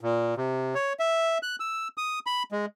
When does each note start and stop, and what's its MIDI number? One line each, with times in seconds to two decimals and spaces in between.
0.01 0.35 46
0.37 0.74 48
0.75 0.93 73
0.99 1.38 76
1.43 1.56 90
1.60 1.88 88
1.97 2.19 87
2.27 2.43 83
2.52 2.66 56